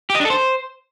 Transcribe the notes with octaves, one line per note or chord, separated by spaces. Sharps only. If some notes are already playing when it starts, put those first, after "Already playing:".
G4
D#5
D4
A4
C5